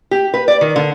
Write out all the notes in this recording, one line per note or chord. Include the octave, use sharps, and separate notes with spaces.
G4
B4
D5
D#3
D3